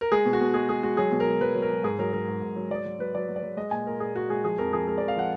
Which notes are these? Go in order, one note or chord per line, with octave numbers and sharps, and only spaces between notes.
A#4
G#3 G#4
B2
F#4
B2
G#3 G#4
G#3 G#4
G#3 F#4
F#3 G#4
B2
A#4
F#3
F#3 B4
F#3
A#4
F#3
G#2 G#4
F#3 A#4
F#3 A#4
G#2
G#2
F#3
F#3 D5
F#3
F#3 B4
F#3 D5
F#3
D5
F#3
G#3 D#5
A#2 G#5
A#2 A#4
A#2 G#4
G#3 F#4
G#3 G#4
F3 G#4
F2 A#4
F3 G#4
G#3 A#4
D5
F2
F5
F3 F#5